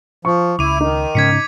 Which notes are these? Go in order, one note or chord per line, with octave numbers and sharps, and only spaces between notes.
F3 C#6
C#2 E4 D6 D#7
D#3 D#4
G#2 C#3 C#4 G#6 B6 C#7